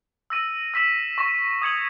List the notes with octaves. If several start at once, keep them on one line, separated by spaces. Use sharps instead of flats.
E6 A#6 D#7
E6 B6 E7
C#6 E6 A#6 E7
D#6 G#6 C#7 F#7